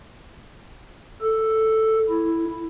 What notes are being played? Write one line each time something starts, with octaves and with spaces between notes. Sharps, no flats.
A4
E4